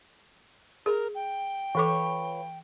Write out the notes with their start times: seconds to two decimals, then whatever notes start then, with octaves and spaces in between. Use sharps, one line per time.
0.86 G#4 A#4
1.15 G5
1.75 E3 F4 A4 B4 C#5 D6